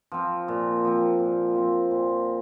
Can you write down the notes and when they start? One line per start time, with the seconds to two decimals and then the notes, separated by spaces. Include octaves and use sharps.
0.12 F3 C4
0.48 A#2
0.85 F3 C4
1.20 A#2
1.55 F3 C4
1.91 A#2